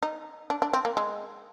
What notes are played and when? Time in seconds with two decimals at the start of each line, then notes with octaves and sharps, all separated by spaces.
0.03 D#4
0.50 D4
0.62 D4
0.73 C4
0.85 A#3
0.97 G#3